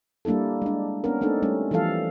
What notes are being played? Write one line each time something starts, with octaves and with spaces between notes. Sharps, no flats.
G3 A#3 D4 E4 A4
G#3 D4
B3 C#4 D4 A#4
A3 C4 D4 D#4 A4
G3 A3 C#4
E3 F3 G3 A4 F5